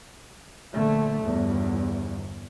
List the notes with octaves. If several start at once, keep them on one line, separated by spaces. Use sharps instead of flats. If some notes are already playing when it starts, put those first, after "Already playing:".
A#1 D3 A3
G1 E2